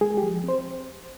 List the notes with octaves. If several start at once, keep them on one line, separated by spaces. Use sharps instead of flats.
G#3 G#4
G4
F3
C4
C5